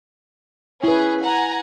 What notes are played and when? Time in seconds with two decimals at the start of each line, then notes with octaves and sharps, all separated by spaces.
0.84 C#4 E4 G#4 B4
1.23 F#5 G#5 A#5